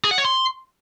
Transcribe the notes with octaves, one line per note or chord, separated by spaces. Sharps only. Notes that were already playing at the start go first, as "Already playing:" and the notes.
G#4
F#5
C#5
C6